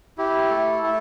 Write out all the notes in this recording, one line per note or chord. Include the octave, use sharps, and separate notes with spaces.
E4 G4
A3 A4
A3 A4